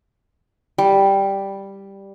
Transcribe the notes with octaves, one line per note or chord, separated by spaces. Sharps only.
G3